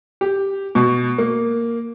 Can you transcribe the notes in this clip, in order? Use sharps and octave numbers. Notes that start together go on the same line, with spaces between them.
G4
B2
A#3